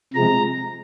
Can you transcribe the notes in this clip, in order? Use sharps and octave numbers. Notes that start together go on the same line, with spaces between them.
C3 F3 G#3 A#5